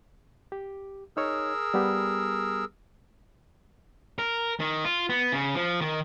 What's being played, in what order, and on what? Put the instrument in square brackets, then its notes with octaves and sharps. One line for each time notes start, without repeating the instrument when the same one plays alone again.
[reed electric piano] G4
[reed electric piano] D#4 C#5 [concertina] G#4 A#4 E6
[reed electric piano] G3 B3 G4
[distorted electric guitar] A#4
D#3
F4
B3
C#3
F3
D#3